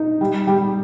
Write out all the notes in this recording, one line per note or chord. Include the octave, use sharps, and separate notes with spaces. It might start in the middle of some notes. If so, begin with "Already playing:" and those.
Already playing: D#4
G3
G3